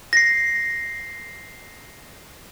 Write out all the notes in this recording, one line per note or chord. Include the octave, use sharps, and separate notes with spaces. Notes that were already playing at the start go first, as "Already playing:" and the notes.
A#6 C7